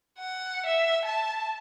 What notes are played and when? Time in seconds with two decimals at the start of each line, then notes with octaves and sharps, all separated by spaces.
0.19 F#5
0.66 E5
1.05 A5